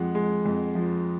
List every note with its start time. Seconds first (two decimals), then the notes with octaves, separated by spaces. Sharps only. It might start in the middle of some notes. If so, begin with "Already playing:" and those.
Already playing: F2 F3 G#3 F#5
0.15 G#3
0.46 F2
0.75 F3